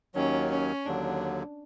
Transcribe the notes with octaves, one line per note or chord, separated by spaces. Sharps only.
D#2 D#3 F#3 C#4
C#4
D#2 D3 F#3 D4